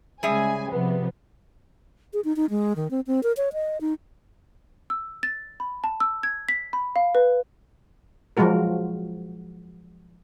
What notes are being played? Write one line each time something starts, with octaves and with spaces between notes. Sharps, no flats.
C#3 G3 G#3 G#4 E5 G#5
C3 F3 B3
G#4
D#4
D#4
G#3
D#3
C4
C4
A#4
C#5
D#5
D#4
E6
A6
B5
A5
E6
G#6
B6
B5
F5
B4
F3 F#3 G#3 F#4 A#4